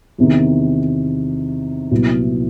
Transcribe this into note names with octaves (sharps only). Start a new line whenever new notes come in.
E2 C3 D#3
C2 A#2 F#3 B3 E4